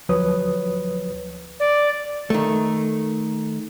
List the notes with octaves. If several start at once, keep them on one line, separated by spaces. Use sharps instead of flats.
D2 F3 F#3 B4 C#5 D#6
D5
D#3 A3